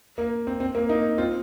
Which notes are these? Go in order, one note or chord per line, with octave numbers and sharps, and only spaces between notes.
A#3
C4
C4
A#3
A#3 D#4
C4 F4